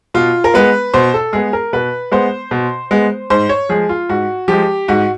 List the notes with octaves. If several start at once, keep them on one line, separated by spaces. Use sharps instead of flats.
B2 F4
A#4
G#3 B3 B4
B2 C5
A4
G#3 B3 G#4
A#4
B2 B4
G#3 B3 C5
B2
G#3 B3
G#2 C5
C#5
F3 G#3 G#4
F4
G#2 F#4
F3 G#3 G4
G#2 F#4